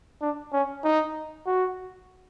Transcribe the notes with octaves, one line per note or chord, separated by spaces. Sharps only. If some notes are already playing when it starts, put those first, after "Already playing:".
D4
C#4
D#4
F#4